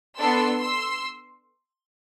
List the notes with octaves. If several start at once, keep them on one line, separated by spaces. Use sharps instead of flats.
B3 D4 A4 C6 E6
C6 E6